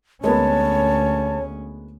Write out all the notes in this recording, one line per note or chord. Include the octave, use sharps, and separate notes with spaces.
D2 G#3 A#3 B3 C#4 C#5 A5